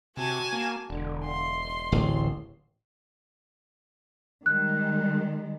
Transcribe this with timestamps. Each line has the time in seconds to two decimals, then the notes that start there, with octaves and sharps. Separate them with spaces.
0.17 C3 F#4 G#5 A5
0.53 A#3
0.90 E1 D3
1.25 C6
1.92 D1 A1
4.46 D#3 G3 G#3 F#6